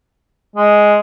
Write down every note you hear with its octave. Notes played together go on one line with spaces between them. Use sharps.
G#3